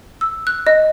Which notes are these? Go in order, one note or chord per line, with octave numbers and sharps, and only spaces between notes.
E6
F#6
D#5